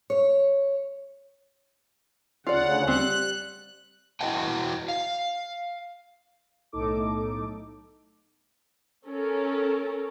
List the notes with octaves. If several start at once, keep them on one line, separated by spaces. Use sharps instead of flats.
C#5
D2 C#3 F4 D5 F#5
G3 C4 F#6
E4 F#4 B4 D#5 F#5 G5
F5
B1 A2 D#4 A4 D6
C#4 A4 A#4